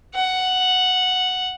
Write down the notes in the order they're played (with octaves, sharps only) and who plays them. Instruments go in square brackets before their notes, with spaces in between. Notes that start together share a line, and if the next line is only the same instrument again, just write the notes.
[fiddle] F#5